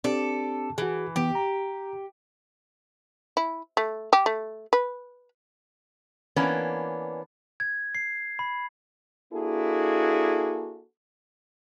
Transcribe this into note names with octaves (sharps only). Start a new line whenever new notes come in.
C4 D4 G4 A4 D5
E3 F#4 G#4
E3 B3 G4
A#5
E4
A3
G4
A3
B4
E3 A#3 B3 C#4 D4
G#6
C7
B5
A#3 D4 E4 F#4 G#4 A4